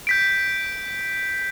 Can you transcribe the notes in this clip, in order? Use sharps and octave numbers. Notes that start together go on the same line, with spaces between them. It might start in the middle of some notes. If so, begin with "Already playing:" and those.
G6 B6 D7